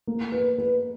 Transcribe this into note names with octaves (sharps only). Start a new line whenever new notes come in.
A#3
B4
B4